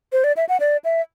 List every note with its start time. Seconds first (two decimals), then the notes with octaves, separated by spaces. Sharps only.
0.12 C5
0.24 D5
0.37 E5
0.49 F#5
0.60 D5
0.85 E5